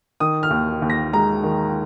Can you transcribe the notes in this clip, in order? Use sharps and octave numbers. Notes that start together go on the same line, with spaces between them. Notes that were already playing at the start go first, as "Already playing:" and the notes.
D#3 D#6
F6
D#2
D#2
A#6
G#3 A#5
D#3